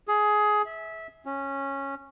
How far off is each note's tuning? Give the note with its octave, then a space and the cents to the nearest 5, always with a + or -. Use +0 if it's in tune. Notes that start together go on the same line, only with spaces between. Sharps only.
G#4 +15
E5 -20
C#4 -10